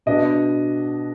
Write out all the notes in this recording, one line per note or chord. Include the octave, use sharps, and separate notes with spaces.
B2 B3 D4 D#5